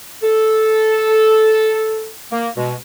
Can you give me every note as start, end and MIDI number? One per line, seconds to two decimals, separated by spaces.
0.23 2.10 69
2.32 2.49 58
2.57 2.74 47
2.57 2.74 56